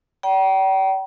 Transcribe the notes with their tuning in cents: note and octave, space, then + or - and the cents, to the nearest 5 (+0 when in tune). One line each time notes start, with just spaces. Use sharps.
D5 -35 G5 -35 A#5 +45